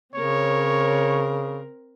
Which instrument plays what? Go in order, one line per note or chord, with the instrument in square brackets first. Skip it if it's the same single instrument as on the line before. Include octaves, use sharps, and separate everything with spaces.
[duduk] C#3 [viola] C4 A#4 [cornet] C#5